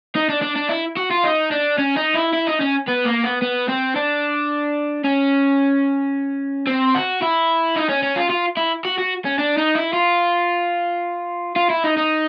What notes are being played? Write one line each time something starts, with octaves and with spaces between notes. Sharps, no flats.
D#4
D4
D4
D4
E4
F#4
F4
D#4
D4
C#4
D#4
E4
E4
D#4
C#4
B3
A#3
B3
B3
C4
D4
C#4
C4
F#4
E4
D#4
C#4
C#4
F4
F4
E4
F#4
F#4
C#4
D4
D#4
E4
F4
F4
E4
D#4
D#4